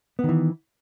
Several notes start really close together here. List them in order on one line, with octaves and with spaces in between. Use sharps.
B3 D#3 E3